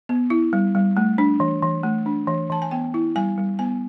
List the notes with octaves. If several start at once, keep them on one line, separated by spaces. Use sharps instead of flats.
B3
E4
G3
G3
A3
D4
E3
E3
A3
D4
E3
E3 A5
G#5
B3 G5
E4
G3 G#5
G3
B3 G#5